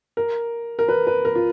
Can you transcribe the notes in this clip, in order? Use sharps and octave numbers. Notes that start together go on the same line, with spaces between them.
A#4
A#4
B4
B4
A#4
F4